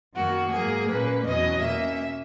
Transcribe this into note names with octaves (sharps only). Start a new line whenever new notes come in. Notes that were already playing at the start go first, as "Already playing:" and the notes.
F#2 D#3 A#3 F#4
G#2 F#3 A#3 G#4
A#2 A#3 C#4 B4
E2 B2 F#3 C#4 D#5
B2 A#3 C#4 E5